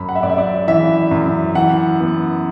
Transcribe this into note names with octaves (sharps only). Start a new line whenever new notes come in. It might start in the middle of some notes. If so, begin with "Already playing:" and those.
Already playing: F#2 B5
F#5
E5
F#2 D5
E5
D5
E3 E5
F#2
E3 F#5
B3